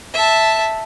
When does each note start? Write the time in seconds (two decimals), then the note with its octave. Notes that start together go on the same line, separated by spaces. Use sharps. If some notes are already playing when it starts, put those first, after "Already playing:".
0.14 E5 A5